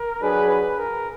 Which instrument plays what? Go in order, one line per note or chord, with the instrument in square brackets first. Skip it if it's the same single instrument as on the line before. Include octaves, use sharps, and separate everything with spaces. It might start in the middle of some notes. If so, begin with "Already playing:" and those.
Already playing: [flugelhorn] A#4
[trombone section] F#3 D4 G#4 [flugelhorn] B4
[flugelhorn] B4
A#4